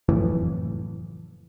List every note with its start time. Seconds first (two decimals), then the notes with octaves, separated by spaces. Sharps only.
0.09 F#1 F2 A2 E3